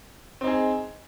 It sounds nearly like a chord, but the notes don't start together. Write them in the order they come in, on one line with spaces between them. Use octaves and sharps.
C4 D#4 G#4